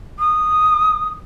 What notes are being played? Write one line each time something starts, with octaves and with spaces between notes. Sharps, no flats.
D#6